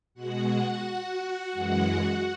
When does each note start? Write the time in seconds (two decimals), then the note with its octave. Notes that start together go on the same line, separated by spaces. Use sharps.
0.14 B2 G#3 F#4 F#5
1.52 F#2 E3 G#3